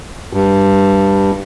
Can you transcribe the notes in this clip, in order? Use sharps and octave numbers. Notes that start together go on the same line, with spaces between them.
G2